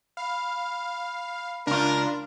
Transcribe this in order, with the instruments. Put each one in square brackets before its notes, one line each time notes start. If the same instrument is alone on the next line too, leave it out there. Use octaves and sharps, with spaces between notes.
[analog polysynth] F5 [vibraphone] B5
[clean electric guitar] C#2 F4 [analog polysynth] D4 [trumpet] A#4